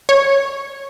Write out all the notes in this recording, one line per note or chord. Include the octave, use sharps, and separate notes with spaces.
C#5